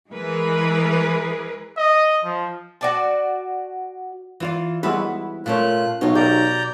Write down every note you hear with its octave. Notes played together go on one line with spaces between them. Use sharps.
E3 G#3 G#4 A#4 B4
D#5
F3
F#4 D5 A5
E3 F4 D5
G3 G#3 B3 E4 F#4 B4
A#2 A3 C#4 F4 F#6
B1 B2 F4 C#5
B2 G4 A#4 D5 A#5 G6